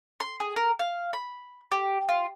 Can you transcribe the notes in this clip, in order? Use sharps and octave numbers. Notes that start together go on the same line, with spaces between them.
C6
G#4
A#4
F5
B5
G4
F4